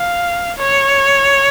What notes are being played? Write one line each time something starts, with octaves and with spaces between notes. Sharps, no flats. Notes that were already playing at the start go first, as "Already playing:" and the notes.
Already playing: F5
C#5